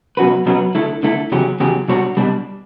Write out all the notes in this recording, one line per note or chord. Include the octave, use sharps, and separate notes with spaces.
B2 F#3 C#4 F#4 B4
B2 F#3 C#4 F#4 B4
D3 A3 E4 A4
D3 A3 E4 A4
E2 C#3 F#3 C#4 G4
E2 C#3 F#3 C#4 G4
B2 G3 D4 F#4 C#5
B2 G3 D4